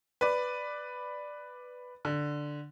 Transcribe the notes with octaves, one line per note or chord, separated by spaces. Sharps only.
B4 D5
D3